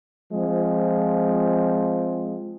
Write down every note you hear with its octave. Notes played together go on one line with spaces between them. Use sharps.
F3 G#3 C4